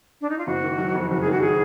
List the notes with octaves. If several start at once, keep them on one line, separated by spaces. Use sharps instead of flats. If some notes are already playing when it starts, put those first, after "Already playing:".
D4
D#4
F4
F#1 F#4
D#3
F#3
F2
F#1 F#4
G#4
D#3 F#4
F#3 G#4